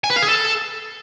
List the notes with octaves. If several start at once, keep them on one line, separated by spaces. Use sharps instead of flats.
G#5
B4
F5
G#4
A4